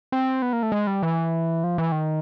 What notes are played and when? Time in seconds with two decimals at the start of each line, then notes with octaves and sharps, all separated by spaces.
0.12 C4
0.42 B3
0.53 A#3
0.63 A3
0.72 G#3
0.87 G3
1.02 E3
1.64 F3
1.78 E3
1.92 D#3